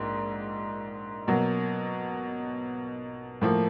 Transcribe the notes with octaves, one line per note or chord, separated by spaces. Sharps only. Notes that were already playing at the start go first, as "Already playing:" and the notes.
Already playing: A#1 G#2 A#3
B2 F#3 A#3
A2 F3 A#3